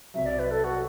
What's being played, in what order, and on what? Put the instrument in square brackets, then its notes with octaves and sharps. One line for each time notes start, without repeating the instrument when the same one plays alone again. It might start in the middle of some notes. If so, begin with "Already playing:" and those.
[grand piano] C2 C3 F#3 [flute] E5
[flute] D5
B4
A4
F#4